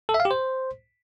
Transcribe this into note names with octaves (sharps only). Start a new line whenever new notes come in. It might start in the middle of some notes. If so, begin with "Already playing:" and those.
A4
E5
F5
G4
C5